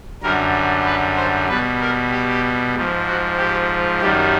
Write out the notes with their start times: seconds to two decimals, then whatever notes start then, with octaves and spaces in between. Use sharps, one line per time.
0.23 F#2 D3 G3 A#4
0.85 B4
1.17 C5
1.49 B2 G3 B4
1.81 A#4
2.12 G4
2.76 G#2 F3
3.07 F#4
3.38 G4
4.01 F#2 D#3 G3 G4